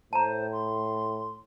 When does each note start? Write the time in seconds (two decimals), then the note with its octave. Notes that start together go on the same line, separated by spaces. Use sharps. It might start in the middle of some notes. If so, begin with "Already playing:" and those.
0.13 A2 C5 A5 A#5
0.52 C6